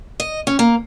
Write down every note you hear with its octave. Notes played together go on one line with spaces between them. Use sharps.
D#5
C#4
A#3